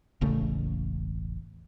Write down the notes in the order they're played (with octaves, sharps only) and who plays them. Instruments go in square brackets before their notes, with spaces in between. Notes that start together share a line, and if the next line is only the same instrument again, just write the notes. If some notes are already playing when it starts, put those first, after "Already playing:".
[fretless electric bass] E1 A1 C#3 A3